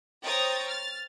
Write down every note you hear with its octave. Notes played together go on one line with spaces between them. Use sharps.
C5 C#5 G5 A#5 D#6 A6
F6 A6